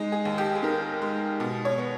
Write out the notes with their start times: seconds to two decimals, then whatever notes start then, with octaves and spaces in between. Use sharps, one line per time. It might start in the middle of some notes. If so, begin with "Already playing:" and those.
Already playing: G#3 D#4
0.12 G#4
0.25 D#2
0.38 G4
0.55 G#4
0.63 D#3 A#4
1.02 G#3
1.40 B2
1.65 C#5
1.78 B3